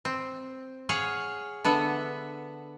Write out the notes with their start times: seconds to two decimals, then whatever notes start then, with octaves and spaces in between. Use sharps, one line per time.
0.05 C4
0.89 G#4 C#5 F5 F#5
1.64 D3 B3 E5 F#5